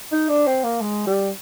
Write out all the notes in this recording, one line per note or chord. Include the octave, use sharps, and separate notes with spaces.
D#4
D4
C4
A#3
G#3
G3